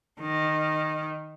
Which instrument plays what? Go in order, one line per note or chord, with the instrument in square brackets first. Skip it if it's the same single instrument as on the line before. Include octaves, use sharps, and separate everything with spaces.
[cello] D#3